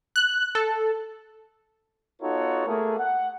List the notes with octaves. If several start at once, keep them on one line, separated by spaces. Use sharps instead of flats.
F#6
A4
B3 D#4 F4 F#4 A4 C#5
A3 A#3 G#4
F#5